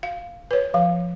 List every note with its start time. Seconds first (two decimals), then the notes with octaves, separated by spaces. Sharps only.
0.03 F5
0.51 B4 C#5
0.74 F3 F5